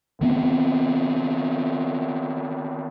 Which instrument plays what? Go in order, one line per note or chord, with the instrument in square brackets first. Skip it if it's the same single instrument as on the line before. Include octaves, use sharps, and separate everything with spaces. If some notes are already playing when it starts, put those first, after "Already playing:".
[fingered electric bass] D#3 B3 C4